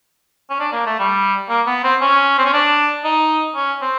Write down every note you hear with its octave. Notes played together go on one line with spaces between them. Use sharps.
C#4
D4
A#3
A3
G3
A#3
B3
C4
C#4
C4
C#4
D4
D#4
C#4
C4